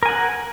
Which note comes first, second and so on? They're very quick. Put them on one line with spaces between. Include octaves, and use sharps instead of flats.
A#4 G#5 F#5